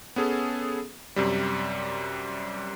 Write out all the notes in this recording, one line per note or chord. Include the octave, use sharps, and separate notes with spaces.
B3 C#4 G#4 A4
F#2 C3 G3